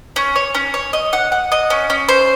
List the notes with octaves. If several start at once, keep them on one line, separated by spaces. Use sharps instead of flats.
C#4
C#5
C#4
C#5
D#5
F#5
F#5
D#5
C#4
C#4
C5